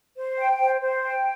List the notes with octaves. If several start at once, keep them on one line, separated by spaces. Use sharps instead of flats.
C5
G5
C5
C5
G5